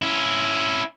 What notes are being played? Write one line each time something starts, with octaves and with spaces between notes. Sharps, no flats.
C#4 E4